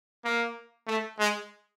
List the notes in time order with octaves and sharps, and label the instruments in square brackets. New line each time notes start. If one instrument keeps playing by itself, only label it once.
[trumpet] A#3
A3
G#3